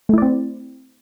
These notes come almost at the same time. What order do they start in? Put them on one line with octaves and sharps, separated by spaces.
A3 E4 D5 C4